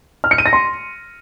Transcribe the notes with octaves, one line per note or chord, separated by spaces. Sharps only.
F6
C#7
D#7
A#6
C6